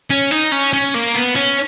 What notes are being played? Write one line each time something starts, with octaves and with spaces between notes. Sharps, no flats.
C#4
D#4
C#4
C#4
A#3
B3
C#4